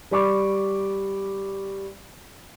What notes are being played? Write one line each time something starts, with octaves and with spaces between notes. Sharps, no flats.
G3 D5 B5 C#6 D6